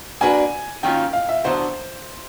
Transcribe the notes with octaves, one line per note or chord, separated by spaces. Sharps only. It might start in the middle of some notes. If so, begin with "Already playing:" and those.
A#3 D4 F#4 B4 G#5
D#3 F#3 A#3 C#4 F4 G5
F5
E5
D3 F#3 B3 C5